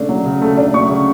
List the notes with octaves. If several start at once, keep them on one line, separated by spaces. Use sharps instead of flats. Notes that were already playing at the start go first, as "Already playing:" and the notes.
Already playing: C#3 A3 D4
F#3
C#3
A3
D4
F#3 C#6
C#3